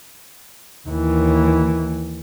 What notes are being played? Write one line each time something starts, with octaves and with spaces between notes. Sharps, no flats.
D#2 E3